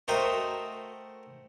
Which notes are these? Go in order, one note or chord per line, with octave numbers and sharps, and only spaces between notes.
A3 F#4 A#4 C5 D#5 G5